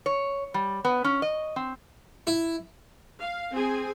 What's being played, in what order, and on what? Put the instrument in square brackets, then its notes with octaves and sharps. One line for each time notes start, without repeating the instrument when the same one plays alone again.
[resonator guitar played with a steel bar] C#5
G3
B3
C#4
D#5
C4
[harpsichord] E4
[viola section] F5
C4 G#4 G#5